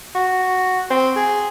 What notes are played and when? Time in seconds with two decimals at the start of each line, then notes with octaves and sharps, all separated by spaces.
0.15 F#4
0.91 C4
1.16 G#4